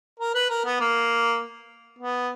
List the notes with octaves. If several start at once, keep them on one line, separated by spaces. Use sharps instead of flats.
A#4
B4
A#4
B3
A#3
B3